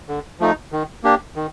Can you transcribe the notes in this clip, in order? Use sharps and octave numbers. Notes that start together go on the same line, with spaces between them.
D3
F3 A3 D#4
D#3
A#3 D4 G4
D#3